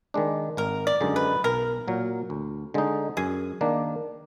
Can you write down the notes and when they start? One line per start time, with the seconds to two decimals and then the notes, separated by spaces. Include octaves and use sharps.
0.14 D#3 G#3 D4
0.57 G#1 A#4
0.87 D5
1.01 F#2 D3 G#3 D#4
1.16 B4
1.44 B1 A#4
1.88 A#2 F#3
2.30 D2
2.74 D3 G#3 D#4
3.17 F#2 G#4
3.61 D#3 A#3 D4